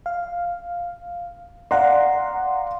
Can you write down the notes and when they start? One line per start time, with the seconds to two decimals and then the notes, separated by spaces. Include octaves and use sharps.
0.06 F5
1.71 D5 F5 F#5 A#5 C6